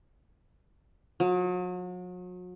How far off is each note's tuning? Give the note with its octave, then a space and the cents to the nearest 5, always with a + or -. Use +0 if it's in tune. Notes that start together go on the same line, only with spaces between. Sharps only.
F#3 -40